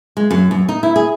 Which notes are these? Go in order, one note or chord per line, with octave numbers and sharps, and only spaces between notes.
G#3
F#2
F#2
D#4
E4
G#4